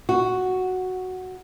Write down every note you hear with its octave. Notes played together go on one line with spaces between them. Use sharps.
F#4